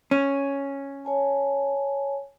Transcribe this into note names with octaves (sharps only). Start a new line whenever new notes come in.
C#4
C#5 G#5 A5